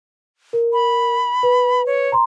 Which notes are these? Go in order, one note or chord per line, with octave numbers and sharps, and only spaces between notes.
A#4
B5
B4
C#5
A#5 C6